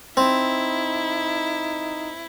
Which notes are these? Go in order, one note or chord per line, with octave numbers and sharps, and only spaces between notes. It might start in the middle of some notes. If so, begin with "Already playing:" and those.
C4 D#4 E4